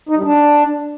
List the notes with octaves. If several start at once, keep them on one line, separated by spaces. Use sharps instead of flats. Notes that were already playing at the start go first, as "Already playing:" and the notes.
D#4
G3
D4